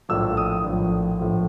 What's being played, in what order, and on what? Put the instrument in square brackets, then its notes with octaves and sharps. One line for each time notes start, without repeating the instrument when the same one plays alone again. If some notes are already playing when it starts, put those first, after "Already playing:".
[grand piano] A#1 A2 F3 E6
D#6
A#1 A2 F3
A#1 A2 F3